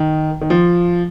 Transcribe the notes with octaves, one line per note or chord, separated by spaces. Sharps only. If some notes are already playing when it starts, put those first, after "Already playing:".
Already playing: D#3
D#3
F3